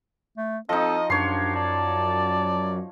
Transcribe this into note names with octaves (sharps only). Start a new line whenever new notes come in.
A3
F3 C4 D#4 A4 D#5
F#2 D4 G4 C#5 C6
D5 A5